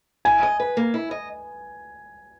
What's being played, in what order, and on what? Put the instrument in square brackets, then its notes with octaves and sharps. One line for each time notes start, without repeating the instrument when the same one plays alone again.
[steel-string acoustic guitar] E4 [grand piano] G#5
[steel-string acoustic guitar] D#5
B4
A#3
E4
D#5